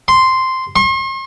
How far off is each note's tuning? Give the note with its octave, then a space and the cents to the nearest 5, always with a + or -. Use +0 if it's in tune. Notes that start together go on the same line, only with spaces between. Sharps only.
C6 -5
C6 +45